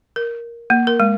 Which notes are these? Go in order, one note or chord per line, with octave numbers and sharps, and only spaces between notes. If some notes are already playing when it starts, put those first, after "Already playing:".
A#4
A#3
A#4
G#3